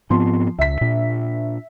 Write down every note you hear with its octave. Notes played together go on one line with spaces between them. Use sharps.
G#2 F3 B3 C4 C6
C#2 E5 B6
A#2 D4